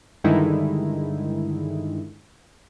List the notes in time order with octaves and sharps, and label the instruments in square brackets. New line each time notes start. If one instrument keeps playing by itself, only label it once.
[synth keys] G2 D3 D#3 G#3 D#4 E4